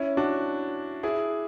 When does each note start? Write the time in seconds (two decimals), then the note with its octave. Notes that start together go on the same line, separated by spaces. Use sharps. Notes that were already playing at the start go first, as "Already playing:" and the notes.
Already playing: C#4 E4
0.17 D4 F#4
1.03 E4 G#4